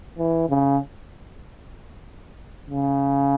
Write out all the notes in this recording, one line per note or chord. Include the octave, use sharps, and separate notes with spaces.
E3
C#3
C#3